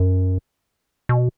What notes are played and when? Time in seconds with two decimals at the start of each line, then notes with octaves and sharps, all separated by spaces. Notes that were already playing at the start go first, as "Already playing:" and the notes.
Already playing: F#2
1.09 B2